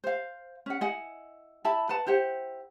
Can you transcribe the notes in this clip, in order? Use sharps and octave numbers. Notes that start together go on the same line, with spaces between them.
C5 F5
C#4 F#5
E4 D#5 F#5 G#5
E4 E5 A5 B5
B4 F#5 A5
E4 G4 C5 F#5